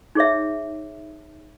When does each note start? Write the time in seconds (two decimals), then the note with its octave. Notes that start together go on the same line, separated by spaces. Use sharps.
0.15 D#4 G#4 C#5 E5